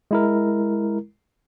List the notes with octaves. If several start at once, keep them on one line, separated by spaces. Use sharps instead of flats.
G#3 E4 A#4